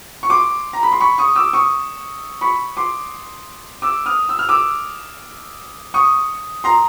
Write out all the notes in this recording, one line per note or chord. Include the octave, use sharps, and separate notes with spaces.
C#6
C6 D6
A#5
B5
C6
B5 C#6
C#6 D#6
D6 E6
C#6 D#6
B5 C#6
C6 D6
D6 E6
D#6 F6
E6
F6
D6 E6
C#6 D#6
A#5 C6